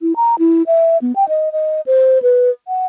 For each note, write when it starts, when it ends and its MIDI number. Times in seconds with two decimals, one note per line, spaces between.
0.02 0.16 64
0.16 0.35 82
0.39 0.63 64
0.67 0.98 76
1.02 1.15 59
1.16 1.28 79
1.29 1.52 75
1.52 1.81 75
1.86 2.21 72
2.22 2.50 71
2.68 2.86 78